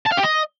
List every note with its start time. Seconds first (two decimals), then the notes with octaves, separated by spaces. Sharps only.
0.06 A5
0.12 F5
0.18 G4
0.24 D#5